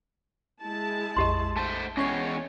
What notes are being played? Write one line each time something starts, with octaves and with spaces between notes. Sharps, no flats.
G#3 E4 A5
A#1 F2 G4 D#5 C6
A3 C5 A5
E2 G#3 C#4 C#5 C#6 C7